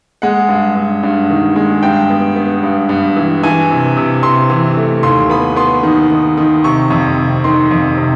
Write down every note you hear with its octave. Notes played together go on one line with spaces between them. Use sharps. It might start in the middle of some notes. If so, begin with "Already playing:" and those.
G#3 F#5
G2
G2
G2
D#3
G#3
G2 G5
B3
B3
G2
G2
E3
E3 G#5
C3
C3
C3 C6
E3
A3
D#2 C6
B3 B5
B3 C6
D#3
D#3
D#3
C3 C#6
F2
C3
D#3 C6
F2
C3